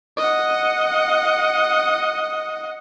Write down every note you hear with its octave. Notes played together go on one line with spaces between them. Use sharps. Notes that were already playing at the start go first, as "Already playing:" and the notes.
D#5 F#5